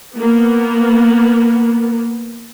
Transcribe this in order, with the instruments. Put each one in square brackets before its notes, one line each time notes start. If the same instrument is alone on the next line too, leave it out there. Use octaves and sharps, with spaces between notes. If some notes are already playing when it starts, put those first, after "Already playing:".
[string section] A#3 B3